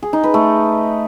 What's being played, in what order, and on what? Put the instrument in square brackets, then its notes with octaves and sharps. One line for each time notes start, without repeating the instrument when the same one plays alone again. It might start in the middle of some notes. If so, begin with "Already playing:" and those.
[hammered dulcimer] G#4
D#4
B4
A3